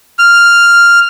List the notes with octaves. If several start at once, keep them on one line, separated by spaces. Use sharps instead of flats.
F6